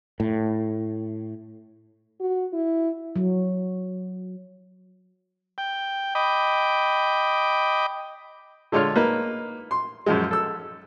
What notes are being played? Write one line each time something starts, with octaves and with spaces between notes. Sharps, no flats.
A2
F#4
E4
F#3
G5
D#5 G5 B5 D6
D3 G#3 F4 C#5 F6
A#3 D#4 B4
C6
F#2 F3 G#3
A4 E6